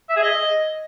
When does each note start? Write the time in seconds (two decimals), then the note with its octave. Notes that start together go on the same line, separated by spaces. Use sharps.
0.09 E5
0.16 G#4
0.23 D#5